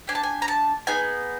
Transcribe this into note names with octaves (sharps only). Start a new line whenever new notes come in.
D4 G4 G#5
A5
G#5
A#5
A5
B3 D#4 G#4 G#5